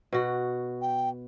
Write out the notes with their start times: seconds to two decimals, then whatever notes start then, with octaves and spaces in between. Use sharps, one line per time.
0.13 B2 F#4
0.82 G5